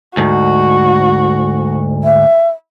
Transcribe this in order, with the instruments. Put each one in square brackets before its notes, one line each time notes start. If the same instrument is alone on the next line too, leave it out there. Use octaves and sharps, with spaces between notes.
[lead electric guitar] D2 G#2 [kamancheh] F#4
[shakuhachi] E5